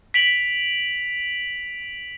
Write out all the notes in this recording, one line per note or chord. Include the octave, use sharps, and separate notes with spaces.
B6 D7 F7 F#7